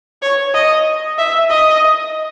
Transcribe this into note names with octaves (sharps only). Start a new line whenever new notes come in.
C#5
D#5
E5
D#5